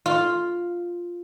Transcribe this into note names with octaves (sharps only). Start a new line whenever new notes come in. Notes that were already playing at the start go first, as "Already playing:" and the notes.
F4